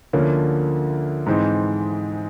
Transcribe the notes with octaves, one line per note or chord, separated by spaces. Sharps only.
D2 D3 F3 A#3 C#4
G#2 E3 G#3 C4 D#4